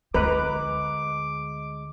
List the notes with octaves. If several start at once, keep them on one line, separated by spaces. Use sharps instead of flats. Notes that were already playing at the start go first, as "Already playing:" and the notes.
D2 G#3 C4 B4 A#5 D6